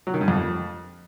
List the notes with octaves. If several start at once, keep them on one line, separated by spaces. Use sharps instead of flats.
F#3
D#3
G2
F2